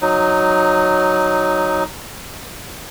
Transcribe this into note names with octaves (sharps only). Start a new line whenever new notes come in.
F#3 D#4